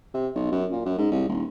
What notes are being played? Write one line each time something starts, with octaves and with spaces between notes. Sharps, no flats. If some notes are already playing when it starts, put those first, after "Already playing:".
C3
B1
F#2
A#2
F#2
G#2
C2
D#1